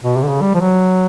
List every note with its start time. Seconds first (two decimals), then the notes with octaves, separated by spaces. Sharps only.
0.04 B2
0.17 C3
0.22 D3
0.28 C#3
0.41 G3
0.55 F3
0.60 F#3